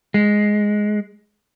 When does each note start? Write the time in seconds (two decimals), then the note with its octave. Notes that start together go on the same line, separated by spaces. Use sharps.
0.14 G#3